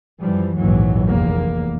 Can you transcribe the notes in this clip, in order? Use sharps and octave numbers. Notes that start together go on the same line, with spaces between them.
F#2 E3 F3 G3
A#1 D#2 G#2 E3 F#3
F1 E2 A#3